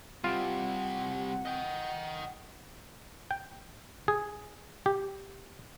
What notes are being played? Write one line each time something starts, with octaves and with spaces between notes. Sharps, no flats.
C3 G3 C4 F4 D5 E5 F#5
D#5 G5
G5
G#4
G4